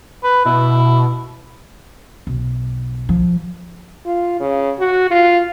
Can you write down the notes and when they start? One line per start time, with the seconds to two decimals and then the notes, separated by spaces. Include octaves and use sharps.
0.24 B4
0.45 B2 E4
2.27 B1
3.09 F3
4.06 F4
4.40 C#3
4.79 F#4
5.11 F4